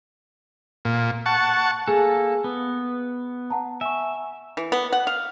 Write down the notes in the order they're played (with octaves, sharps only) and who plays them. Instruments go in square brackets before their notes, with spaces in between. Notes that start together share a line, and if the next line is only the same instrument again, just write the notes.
[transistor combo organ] A#2
F#5 A5 C#6
[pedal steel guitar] A#3 A4 [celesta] G#4 G#5
[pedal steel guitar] B3 [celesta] B5
[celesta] F#5 A5 A#5
[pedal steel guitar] E5 [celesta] G#5 C#6
[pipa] E3
B3
F#5
F5